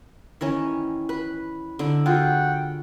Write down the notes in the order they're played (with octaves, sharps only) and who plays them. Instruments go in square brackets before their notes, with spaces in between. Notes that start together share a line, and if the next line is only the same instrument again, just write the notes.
[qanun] D#3 E3 C#4
B4
D3 D#4 E4
[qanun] F4 F#4 G#4 [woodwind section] F#5 G5